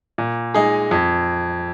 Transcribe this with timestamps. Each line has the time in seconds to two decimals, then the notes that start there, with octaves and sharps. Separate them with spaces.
0.18 A#2
0.54 G#3 D#4 G#4
0.91 F2